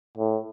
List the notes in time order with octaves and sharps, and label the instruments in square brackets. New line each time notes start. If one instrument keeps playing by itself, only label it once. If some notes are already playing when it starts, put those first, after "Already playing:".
[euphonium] A2